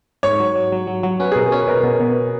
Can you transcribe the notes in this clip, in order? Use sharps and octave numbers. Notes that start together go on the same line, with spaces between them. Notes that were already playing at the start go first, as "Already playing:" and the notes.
G#2 C#5
F#3
F#3
F#3
F#3
F#3
C#4 B4
G#4
B2 A#4
C#4 C#5
B4
B2 A#4
B2
B2